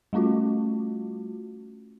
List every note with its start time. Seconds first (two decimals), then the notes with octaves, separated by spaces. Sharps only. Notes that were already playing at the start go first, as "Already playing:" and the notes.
0.13 G3 A3 C#4 F4 F#4